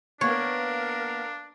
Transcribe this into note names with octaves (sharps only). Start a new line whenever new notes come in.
A#3 B3 D4 A#4 C#5 F5